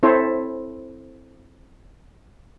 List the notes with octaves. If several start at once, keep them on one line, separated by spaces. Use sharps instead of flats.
C4 E4 A4 C5 C#5